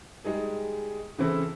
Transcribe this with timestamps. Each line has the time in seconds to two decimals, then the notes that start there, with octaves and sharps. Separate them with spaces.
0.24 G3 G#3 D#4 G#4
1.18 C#3 E3 C4 E4 A4